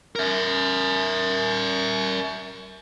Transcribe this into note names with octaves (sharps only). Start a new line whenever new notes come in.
A#4 E5